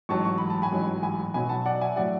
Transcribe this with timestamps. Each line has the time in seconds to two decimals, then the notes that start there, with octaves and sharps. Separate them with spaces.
0.09 A1 G#2 F#3 A5 C#6
0.25 C#6
0.38 B5
0.50 A5
0.62 G#5 B5
0.72 A1 G#2 F#3
1.03 G#5 B5
1.34 B1 B2 F#3 G#5 B5
1.49 F#5 A5
1.66 D5 F#5
1.81 E5 G#5
1.96 A2 F#3 D5 F#5